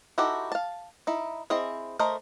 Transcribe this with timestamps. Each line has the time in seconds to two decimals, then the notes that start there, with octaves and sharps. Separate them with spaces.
0.18 D#4 E4 F#4 G4 A4
0.52 F5 A5
1.07 D#4 E4
1.50 C4 E4 G#4 D#5
1.99 A3 A4 A#4 C5 D#5